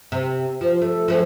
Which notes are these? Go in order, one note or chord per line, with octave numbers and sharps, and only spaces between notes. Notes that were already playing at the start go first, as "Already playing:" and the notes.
C3
F3
A3
F3 A3 C#4